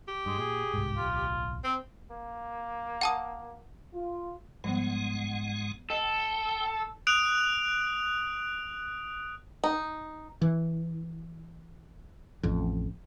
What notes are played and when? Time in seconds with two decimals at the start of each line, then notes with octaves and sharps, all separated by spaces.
0.08 G4
0.26 G2 G#3
0.38 A#2 G#4
0.74 G1 C2 G#2
0.97 D1 B1 F4
1.64 C4
2.11 A#3
3.01 F#5 A5 D#6
3.94 F4
4.64 G#2 F3 G3 G#3 B3 F#5
5.90 A4 D#5 G5
7.07 D#6 F#6 D7 F7 F#7
9.64 D#4
10.41 E3
12.43 A1 F2